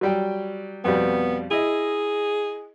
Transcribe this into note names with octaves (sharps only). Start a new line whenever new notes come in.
F#3 G3 G5
F2 B2 G3 B3
E4 G#4 D#5